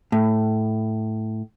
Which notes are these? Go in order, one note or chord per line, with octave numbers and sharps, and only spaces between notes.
A2